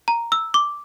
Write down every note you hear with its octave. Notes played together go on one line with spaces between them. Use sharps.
A#5
E6
D6